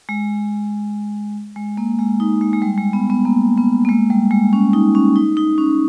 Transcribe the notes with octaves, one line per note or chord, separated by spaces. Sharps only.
G#3
G#3
A#3
G#3
D#4
G#3
G#3
G3
G#3
B3
B3
A#3
B3
A#3
G#3
G3
G#3
C#4
D#4
C#4
D#4
D#4
C#4